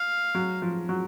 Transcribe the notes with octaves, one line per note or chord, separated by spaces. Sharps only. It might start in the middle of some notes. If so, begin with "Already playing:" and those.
Already playing: F5
F#3
F3
F#3